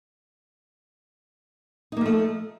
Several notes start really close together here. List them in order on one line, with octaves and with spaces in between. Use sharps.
D#4 A#3 F3 A3